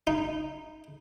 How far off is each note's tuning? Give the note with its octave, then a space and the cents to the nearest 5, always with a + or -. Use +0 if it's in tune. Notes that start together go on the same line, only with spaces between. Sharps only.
D#4 -10